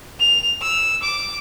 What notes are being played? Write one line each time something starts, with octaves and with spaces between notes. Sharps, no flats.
F7
E6
D6